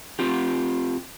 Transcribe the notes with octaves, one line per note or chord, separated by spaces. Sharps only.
C4 F4 G4